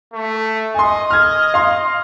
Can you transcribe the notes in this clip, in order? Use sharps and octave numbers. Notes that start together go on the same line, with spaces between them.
A3
D#5 G#5 C6
F6 G#6
F5 C6